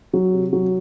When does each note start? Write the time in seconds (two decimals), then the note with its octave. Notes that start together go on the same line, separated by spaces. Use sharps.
0.13 F#3
0.33 C3
0.53 F#3